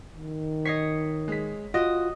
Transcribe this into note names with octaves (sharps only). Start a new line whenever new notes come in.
D#3
C#5 D#5 B6 C7
G#3 B6
F4 F#4 D#5